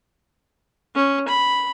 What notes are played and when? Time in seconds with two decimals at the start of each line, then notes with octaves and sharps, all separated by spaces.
0.96 C#4
1.28 B5